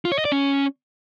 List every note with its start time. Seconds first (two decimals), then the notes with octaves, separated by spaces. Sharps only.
0.05 F4
0.12 C#5
0.18 D#5
0.25 D5
0.32 C#4